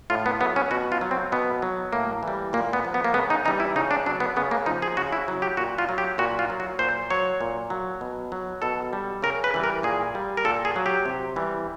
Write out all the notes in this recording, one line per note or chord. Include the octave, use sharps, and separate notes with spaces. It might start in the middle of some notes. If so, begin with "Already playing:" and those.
A2 F4
B3
F#3 B3
C#4
B2 F#4
F4
F#3
C4
B2 B3
F#3
A2 A#3
E3 G3
A#2 A#3
B3
F3
B3
A#3
C#3 B3
D#4
E3 G3 D#4
E4
C#3 D#4
D4
F#3 D4
B3
C#3 B3
A#3
F3 D#4
G#4
C#3 F#4
E4
F#3
G4
A#2 F#4
F4
F#3
G4
A#2 F#4
F4
F#3
F#4
A#2 C5
F#3 C#5
A#2
F#3
B2
F#3
B2 A4
G3
C#3 A#4
B4
E3 G3
A#4
A#2 G#4
G3
A#4
A#2 A4
G#4
F#3
G4
C3
E3 G3